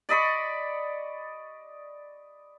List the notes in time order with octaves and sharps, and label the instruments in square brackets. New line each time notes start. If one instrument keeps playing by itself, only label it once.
[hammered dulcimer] D5 D#5 B5 C#6